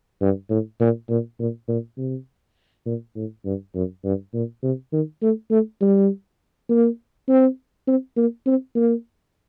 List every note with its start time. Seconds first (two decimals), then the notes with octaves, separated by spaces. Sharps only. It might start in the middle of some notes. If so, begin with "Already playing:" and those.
0.22 G2
0.50 A2
0.80 A#2
1.09 A#2
1.39 A#2
1.68 A#2
1.98 C3
2.86 A#2
3.16 A2
3.45 G2
3.75 F#2
4.04 G2
4.34 A#2
4.63 C3
4.93 D#3
5.22 A3
5.51 A3
5.81 G3
6.70 A#3
7.29 C4
7.87 C4
8.17 A#3
8.47 C4
8.76 A#3